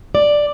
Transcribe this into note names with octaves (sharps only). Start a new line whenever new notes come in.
D5